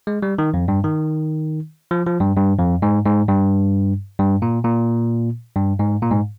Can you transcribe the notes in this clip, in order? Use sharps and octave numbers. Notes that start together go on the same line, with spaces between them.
G#3
G3
D#3
F2
G2
D#3
F3
F3
G2
G2
F2
G#2
G#2
G2
G2
A#2
A#2
G2
G#2
A#2
G#2